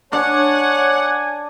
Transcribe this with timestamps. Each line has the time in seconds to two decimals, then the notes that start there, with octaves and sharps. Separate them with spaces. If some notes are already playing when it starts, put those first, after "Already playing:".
0.13 D4 C#5 F#5 G#5